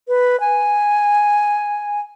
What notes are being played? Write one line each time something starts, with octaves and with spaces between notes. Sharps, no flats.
B4
G#5